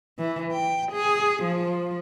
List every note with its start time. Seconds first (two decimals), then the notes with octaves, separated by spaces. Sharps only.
0.18 E3
0.52 G5
0.92 G#4
1.43 F3